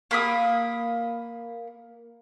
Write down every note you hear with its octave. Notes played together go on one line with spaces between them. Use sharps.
A#3 B5 D#6